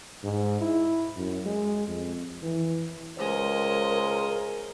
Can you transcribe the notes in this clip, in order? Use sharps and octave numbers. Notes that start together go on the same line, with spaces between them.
G#2
E4
F#2
G#3
F2
E3
C#2 G#3 A#4 C5 D#5